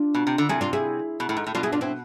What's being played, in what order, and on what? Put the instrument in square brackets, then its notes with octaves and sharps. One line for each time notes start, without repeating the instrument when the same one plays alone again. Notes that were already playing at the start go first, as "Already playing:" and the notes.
Already playing: [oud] D4 F4
[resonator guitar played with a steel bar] B2
C3
D3
[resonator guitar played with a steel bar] C3 [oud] E4 G#4
[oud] D4 F4
E4 G#4
[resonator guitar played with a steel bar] B2
A2
G#2
A2
[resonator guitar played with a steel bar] B2 [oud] D4 F4
[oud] E4 G#4
D4 F4
C4 E4